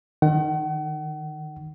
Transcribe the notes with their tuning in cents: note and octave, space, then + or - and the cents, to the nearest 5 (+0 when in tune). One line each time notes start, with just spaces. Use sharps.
D#3 -15 F#5 +40